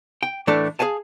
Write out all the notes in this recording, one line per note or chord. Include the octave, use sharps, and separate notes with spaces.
G5
A2 E3 A3 D4 A4
G#4 B4 F5 G#5 A5